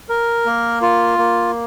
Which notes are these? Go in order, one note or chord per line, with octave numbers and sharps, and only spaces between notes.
A#4
A#3
F4
A#3